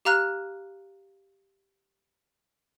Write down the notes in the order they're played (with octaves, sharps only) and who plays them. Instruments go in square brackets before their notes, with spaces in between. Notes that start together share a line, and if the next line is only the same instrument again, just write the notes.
[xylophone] G4 F5 A#5 F6 F#6